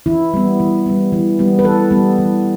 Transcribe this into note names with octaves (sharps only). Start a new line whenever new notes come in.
E3 E4
G3 B3
E3
G3 B3
E3
G3 B3
B4
E3 A4
G3 B3
E3